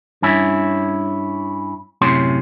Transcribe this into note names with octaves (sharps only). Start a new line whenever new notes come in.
G2 C#4 E4
F#2 A2 C3 C#4 C6